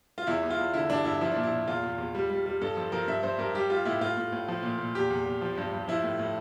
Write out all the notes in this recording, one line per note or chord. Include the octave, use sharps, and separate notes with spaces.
F4
E2 E4
E2
F4
E2
D3 E4
G2 D4
G2 E4
F3 E4
A#2 D4
E4
A#2
E2 F4
E2
E2
G3
G3
G3
G2 A4
F3 A4
F3 A#4
G2 E5
G2 C5
G2 A#4
G3 G4
G3 F4
A2 E4
A2 F4
A2
A2
F3
A#2
A#2
E2 G4
E2
E2
F3
G2
G2
F3 E4
A2
A2